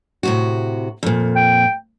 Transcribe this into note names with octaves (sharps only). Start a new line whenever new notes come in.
A2 C3 F#4
F2 A#2
G5